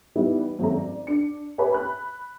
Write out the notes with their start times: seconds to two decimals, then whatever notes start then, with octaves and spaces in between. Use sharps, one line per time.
0.16 E3 G3 B3 D#4 E4
0.59 G#1 F#2 G#3 A3 C#4 A#5
0.76 D5
1.07 D4 C#7
1.58 G4 B4 C#5 E5 G#5 B5
1.72 B5 F#6